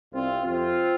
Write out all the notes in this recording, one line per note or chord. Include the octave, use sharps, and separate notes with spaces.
C2 C3 C4 F4
F2 C3 C4 F4